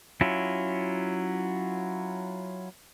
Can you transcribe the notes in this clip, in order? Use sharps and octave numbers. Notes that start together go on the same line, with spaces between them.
F#3 C#4 E4 F4